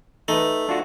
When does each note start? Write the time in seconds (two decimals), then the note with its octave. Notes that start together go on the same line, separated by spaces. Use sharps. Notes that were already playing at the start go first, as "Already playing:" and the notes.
0.28 A3 D#4 B4
0.69 D4 F4 F#4